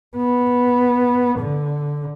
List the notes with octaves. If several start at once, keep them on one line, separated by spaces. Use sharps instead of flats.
B3
D3